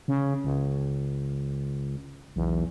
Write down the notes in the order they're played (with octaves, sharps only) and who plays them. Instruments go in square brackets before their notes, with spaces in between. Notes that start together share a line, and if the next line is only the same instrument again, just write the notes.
[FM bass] C#3
C#2
[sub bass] B1 [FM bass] E2